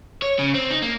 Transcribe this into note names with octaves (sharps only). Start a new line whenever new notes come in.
C#5
C#3
C4
D#4
A#3